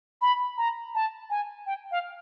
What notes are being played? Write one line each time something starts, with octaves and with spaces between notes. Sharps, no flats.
B5
A#5
A5
G#5
G5
F5